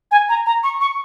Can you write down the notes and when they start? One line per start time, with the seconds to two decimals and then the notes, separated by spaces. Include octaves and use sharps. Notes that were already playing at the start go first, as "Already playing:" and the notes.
0.11 G#5
0.29 A#5
0.46 A#5
0.63 C#6
0.81 C#6